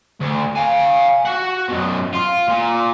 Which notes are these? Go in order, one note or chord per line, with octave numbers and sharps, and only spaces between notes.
D2
F5 G#5
F#4 F#5
F#2 B2
F4
A#2